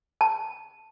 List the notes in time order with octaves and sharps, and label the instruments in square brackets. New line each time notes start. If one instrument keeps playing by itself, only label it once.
[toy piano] A5